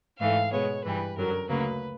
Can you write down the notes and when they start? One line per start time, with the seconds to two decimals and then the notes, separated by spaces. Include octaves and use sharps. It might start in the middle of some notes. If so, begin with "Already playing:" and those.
0.19 G#2 E3 A3 F5
0.51 B2 G#3 B3 C#5
0.84 G2 E3 G3 B4
1.16 F#2 D3 F#3 A#4
1.49 D2 C#3 F#3 A#3 B4